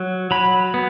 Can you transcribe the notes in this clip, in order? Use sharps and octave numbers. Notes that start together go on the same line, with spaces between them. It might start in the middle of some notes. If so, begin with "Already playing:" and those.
Already playing: F#3
F#3 B5
B3